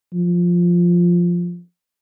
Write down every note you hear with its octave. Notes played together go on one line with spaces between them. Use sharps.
F3